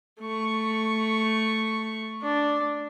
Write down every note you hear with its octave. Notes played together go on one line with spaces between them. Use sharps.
A3 C#6
D4